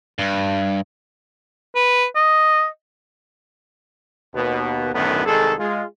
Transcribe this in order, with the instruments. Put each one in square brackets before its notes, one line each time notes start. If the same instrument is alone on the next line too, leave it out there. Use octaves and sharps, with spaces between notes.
[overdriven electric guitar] G2
[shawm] B4
D#5
[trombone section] D#2 B2 B3
B1 F#2 A2 D3 D#3 B3
C2 D#3 G#3 G#4 A4
G#3 F4